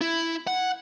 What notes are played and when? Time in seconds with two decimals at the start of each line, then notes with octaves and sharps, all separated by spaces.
0.01 E4
0.47 F#5